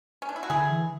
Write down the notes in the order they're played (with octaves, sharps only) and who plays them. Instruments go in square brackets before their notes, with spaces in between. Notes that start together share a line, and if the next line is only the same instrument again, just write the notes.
[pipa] C#4
D4
E4
F#4
[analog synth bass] D3 [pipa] E4 G#4
[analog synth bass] E3